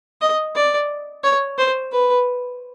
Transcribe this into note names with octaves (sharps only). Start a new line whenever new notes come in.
D#5
D5
C#5
C5
B4